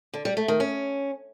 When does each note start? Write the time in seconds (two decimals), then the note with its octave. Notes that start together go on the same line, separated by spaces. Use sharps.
0.14 D3
0.25 G3
0.37 A3
0.48 D#3
0.60 C#4